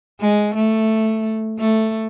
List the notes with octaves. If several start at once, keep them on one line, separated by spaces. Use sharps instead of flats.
G#3
A3
A3